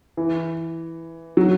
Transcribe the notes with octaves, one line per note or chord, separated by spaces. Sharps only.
E3
F#3